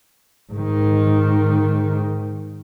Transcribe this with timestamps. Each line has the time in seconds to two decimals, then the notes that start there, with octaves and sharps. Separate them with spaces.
0.53 G#2 D#3